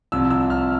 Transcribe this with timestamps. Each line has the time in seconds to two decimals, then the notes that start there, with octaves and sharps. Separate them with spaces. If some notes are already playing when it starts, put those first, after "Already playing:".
0.12 C2 C3 F3 E6
0.30 E6
0.50 F6